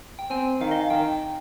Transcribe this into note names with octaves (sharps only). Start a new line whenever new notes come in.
G5
C4 G#5
D#3 F5
D#5
F5
D#3 G5